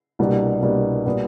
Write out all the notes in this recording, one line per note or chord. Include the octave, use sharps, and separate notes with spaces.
C2 B2 G3 A#3 D4
C2 B2 G3 A#3 D4
A#2 G3 B3